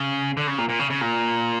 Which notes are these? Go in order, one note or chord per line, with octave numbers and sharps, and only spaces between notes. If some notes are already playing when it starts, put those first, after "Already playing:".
Already playing: C#3
D3
C#3
A#2
A#2
C#3
C#3
A#2